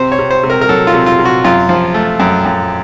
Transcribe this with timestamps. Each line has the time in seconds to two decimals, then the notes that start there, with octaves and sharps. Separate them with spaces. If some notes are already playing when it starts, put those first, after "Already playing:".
Already playing: C3 C5
0.12 C#5
0.19 C3
0.31 C5
0.43 C3
0.50 A#4
0.61 A#4
0.69 F#3 A4
0.87 F4
0.94 C3
1.06 F4
1.19 C3
1.25 F#4
1.44 F#2 F4
1.69 F3
1.94 A3
2.20 F#2
2.45 F#2